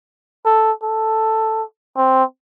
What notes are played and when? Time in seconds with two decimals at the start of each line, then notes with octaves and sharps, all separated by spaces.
0.45 A4
0.83 A4
1.97 C4